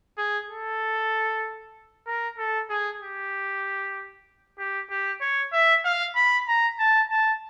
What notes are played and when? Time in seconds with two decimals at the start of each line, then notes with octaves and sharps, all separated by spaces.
0.18 G#4
0.49 A4
2.07 A#4
2.38 A4
2.69 G#4
3.02 G4
4.59 G4
4.90 G4
5.21 C#5
5.53 E5
5.85 F5
6.16 B5
6.48 A#5
6.79 A5
7.10 A5